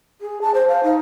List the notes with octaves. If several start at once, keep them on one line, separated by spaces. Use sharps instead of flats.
G#4
A5
C5
F5
D#4